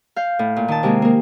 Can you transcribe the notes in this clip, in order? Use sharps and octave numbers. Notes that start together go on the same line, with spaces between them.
F5 G6
A2
A#2
D#3 A5
C3 G#3 A#3
A#3 A#4